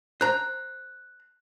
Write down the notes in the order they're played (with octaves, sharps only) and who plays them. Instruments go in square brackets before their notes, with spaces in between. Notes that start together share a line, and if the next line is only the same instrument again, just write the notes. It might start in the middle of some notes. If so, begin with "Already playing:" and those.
[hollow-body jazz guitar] C5 A#5 [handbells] F#6